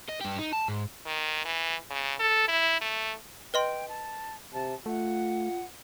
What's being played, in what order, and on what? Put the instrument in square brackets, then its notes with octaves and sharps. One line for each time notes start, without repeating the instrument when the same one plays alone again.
[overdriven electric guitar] D#5
G2 G4
D#4
A5
G#2
[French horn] D#3
E3
C#3
A4
E4
A3
[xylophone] B4 D#5 C6 [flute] G5
[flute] A5
[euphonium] C3 [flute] A5
[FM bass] A3 [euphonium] F4 [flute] F#5